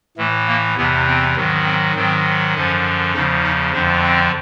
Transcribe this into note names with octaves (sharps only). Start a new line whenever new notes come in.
A2 E3 A3
A#3
E2 C3 E3 B3
C4
G#2 D#3 F#3
C4
G#2 D#3 F#3 C4
F#2 D3 F3 C#4
E2 C#3 F3 D#4
D#4
F2 D3 F3 D4
C4